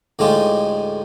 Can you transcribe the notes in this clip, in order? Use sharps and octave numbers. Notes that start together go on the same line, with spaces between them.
D2 A2 G#3 D#4 F4 G4